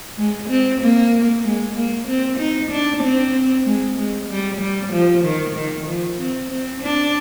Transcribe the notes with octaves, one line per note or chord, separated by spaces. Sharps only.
G#3
C4
A#3
G#3
A#3
C4
D#4
D4
C4
G#3
G#3
G3
G3
F3
D#3
D#3
F3
C4
C4
D4